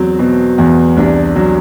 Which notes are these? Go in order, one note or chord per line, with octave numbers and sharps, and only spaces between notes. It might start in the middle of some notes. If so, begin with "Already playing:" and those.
Already playing: E2 F#3 C4
B2
E2
C2 D4
F#3